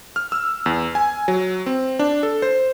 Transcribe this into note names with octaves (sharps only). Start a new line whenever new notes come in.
F6
E6
E2
G#5
F#3
C4
D4
A4
C5